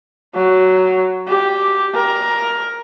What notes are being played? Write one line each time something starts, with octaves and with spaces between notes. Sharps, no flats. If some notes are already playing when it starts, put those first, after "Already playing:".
F#3
G4
A#4